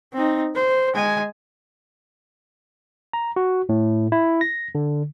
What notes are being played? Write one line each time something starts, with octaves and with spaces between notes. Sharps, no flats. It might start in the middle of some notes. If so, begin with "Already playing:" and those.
C4 D#4
C5
G#3 G#5
A#5
F#4
A2
E4
A#6
D3